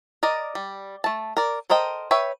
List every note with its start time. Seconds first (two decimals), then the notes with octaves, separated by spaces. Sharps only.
0.23 A#4 D5 D#5
0.55 G3
1.04 A3 A5
1.37 A#4 D5
1.69 A4 A#4 C5 D#5 G5
2.11 B4 C#5 E5 G5